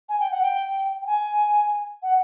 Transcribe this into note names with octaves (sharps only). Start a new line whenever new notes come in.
G#5
G5
F#5
G5
G5
G#5
F#5